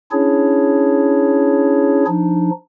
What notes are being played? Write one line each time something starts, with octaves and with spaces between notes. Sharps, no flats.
C#4 D4 E4 G#4 C#5
F3 D4 D#4